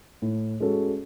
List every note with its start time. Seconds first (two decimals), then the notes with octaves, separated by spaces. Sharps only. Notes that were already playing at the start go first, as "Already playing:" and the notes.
0.22 A2
0.60 G#3 C#4 F#4 A4